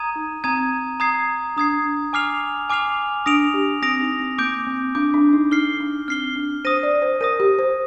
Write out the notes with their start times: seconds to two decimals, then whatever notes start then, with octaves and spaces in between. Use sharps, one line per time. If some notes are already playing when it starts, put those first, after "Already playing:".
Already playing: A#5 D#6 G#6 D#7
0.16 D#4
0.44 C4 A#5 D#6 G#6 D#7
1.00 A#5 D#6 G#6 C7
1.56 D4 A#5 D#6 G#6 C7
1.85 D4
2.13 G#5 D6 F6 C7 F7
2.70 G#5 D6 F6 C7 F7
3.26 D4 D#6 A#6 D7 F7
3.54 G4
3.82 C4 D#6 A#6 D7 F7
4.01 D#4
4.20 C4
4.38 A#3 D6 G6 D7
4.67 C4
4.95 D4 D6 G6 D7
5.14 D4
5.33 D#4
5.51 D#4 F6 C7 G7
5.80 D4
6.08 C4 F6 C7 G7
6.36 D4
6.65 C5 D#6 A#6 D#7
6.83 D5
7.02 C5
7.21 A#4 D#6 A#6 D#7
7.40 G4
7.59 C5